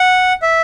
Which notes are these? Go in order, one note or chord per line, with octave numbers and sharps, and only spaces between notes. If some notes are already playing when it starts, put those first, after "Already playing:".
Already playing: F#5
E5